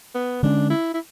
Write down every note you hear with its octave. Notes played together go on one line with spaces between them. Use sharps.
B3
D3 G#3 C#4 D4
E4
E4